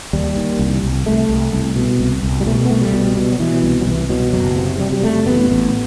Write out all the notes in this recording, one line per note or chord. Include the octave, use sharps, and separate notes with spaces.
D#2 G3
D#2
C2
C2
C2 A3
C2
C2
B2
C2
C2
G3
B2 A3
B3
C2 A3
G3
B2
B2
F#3
B2 E3
C2
F#3
C2 E3
B2 F#3
F#1 F#3
C3
C3 G3
G3
F#1 A3
A1 B3
A1